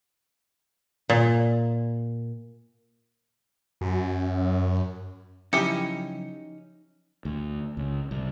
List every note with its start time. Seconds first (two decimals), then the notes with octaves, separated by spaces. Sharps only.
1.10 A#2
3.81 F#2
5.53 C#3 F3 F#3 C#4 D#4 E4 G4 C#7
7.25 D2
7.77 C#2
8.11 C2